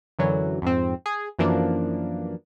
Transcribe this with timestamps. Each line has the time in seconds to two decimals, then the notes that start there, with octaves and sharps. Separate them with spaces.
0.19 F#2 D3 E3 F#3
0.62 F2 G#2 C4
1.06 G#4
1.39 F#2 E3 F3 A#3 D4